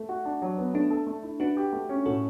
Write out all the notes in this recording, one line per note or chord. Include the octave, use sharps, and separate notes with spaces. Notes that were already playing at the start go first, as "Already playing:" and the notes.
Already playing: A3
F#4
D4
F#3
B3
A3 D4
A4
A3
E4
D4 F#4 B4
G4
A3
C#4
A2 F#4 A4